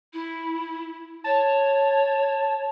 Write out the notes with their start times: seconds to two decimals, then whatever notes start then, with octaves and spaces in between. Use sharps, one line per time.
0.13 E4
1.24 C#5 A5